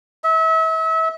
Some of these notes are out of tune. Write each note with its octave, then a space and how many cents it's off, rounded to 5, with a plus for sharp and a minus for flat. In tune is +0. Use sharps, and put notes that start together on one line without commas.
E5 -35